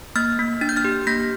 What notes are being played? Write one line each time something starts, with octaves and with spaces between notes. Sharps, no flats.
A#3 F6 A6
A#3
D4 A6
G6
F6 A6
G4
A#3 G6 A#6